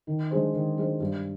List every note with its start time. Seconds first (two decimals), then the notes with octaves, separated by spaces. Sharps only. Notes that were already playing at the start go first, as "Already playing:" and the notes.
0.07 D#3
0.31 G#3 D4 G#4 C5
0.54 D#3
0.77 G#3 D4 G#4 C5
1.00 G2